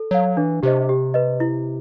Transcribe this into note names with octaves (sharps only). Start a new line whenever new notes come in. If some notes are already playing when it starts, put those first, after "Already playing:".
Already playing: A4
F#3 C#5 F5
E3 D4
C3 G4 C5 D#5
G4
B4 D#5
E4